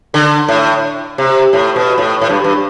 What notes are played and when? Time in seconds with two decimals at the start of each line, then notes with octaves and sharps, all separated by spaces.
0.14 D3
0.49 A2
1.18 C3
1.53 A2
1.76 B2
1.98 A2
2.21 A2
2.29 G2
2.44 G2